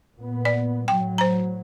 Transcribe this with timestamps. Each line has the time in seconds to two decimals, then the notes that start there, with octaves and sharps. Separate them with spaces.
0.17 A#2 B3
0.45 D5
0.88 A2 F#3 G5
1.18 C5 A#5